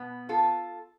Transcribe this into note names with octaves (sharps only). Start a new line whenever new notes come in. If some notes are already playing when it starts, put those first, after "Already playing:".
Already playing: B2 B3
F4 A4